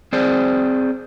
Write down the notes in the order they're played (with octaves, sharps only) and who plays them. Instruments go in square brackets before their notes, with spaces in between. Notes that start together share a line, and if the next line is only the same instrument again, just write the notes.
[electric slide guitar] C4 G#4 C5 D5